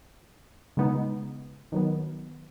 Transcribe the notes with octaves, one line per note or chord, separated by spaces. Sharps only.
C#3 G#3 B3 D#4
D#3 F#3 B3